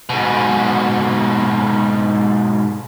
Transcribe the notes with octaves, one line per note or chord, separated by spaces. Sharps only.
G#2 B2